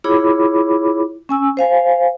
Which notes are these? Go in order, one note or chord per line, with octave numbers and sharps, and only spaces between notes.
E4 F4 G#4 C#5 B5 D6
C#4 G#5 E6
C5 F5 G#5